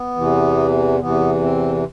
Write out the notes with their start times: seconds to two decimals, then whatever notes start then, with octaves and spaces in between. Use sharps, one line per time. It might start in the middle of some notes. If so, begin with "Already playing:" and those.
Already playing: B3
0.16 E2 C3 E3
1.00 E2 C3 E3 B3
1.43 C4